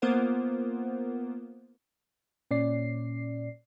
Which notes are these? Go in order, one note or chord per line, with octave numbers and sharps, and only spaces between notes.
A#3 B3 F4 A#4 C5 F#5
A#2 C#4 D5 C7